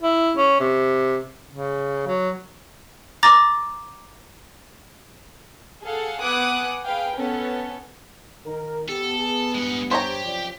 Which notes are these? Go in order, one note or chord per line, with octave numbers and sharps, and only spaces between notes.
E4
C#4
C3
C#3
F#3
A#5 D6 A6 A#6
G#4 A4 F5 F#5
B3 F#5 G#5 D6 D#6 F#6
G#4 B4 F5 G5
B3 C#4 A4
D#3 D#4 A#4
B3 G4 A4
G#4
G2 G#3 F#5
G4 C5 C#5 A#5
F#2 C3 F3 D5